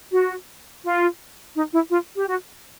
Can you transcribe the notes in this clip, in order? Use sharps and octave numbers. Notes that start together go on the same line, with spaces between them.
F#4
F4
D#4
E4
F4
G4
F#4